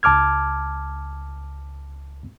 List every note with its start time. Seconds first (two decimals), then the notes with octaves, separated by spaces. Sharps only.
0.03 C#2 A5 D6 F6 G#6